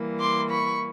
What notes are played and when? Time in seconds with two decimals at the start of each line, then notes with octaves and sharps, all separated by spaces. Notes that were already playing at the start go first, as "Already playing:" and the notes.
Already playing: E3 G3 A#3
0.20 C6 D6
0.49 B5 C#6